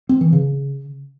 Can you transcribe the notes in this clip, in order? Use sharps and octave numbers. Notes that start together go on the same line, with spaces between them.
C4
E3
C#3